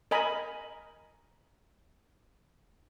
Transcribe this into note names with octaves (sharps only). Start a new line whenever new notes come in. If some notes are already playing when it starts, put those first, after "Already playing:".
A#4 D#5 G#5 B5